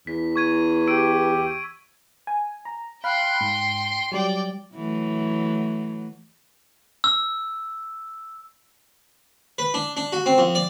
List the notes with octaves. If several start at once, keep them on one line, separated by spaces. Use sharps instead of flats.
E2 B6
C#6 G#6 D#7
G4 E6 D7 D#7
G#5
A#5
F5 G5 B5 C6 F#6
G#2
F#3 G3 D5 G5
E3 F#3 A3
E6
B4
D4
D4
F#4
C4
F2
D5